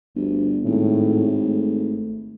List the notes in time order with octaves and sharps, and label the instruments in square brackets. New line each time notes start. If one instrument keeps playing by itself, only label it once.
[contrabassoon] G1 [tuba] D2
[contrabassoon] G#1 [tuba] A2
[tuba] A3